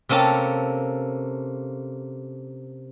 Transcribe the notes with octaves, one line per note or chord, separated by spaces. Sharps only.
C3 A#3 C#4 A4 A5